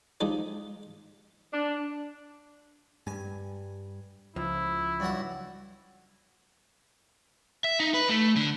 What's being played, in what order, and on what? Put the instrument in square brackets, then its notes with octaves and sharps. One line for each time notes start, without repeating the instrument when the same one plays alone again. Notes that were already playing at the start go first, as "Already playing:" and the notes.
[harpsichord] F3 G#3 D#4 G4 D5
[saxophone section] D4
[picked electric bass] G2 G3 [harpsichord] G#5
[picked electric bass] C#2 [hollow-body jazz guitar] F3 [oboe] E4
[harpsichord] G2 F#3 F#5
[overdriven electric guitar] E5
D#4
B4
A3
D3